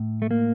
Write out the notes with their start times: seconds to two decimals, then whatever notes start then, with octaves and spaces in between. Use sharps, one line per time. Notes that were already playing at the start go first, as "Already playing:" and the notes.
Already playing: A2
0.22 A3
0.31 A#3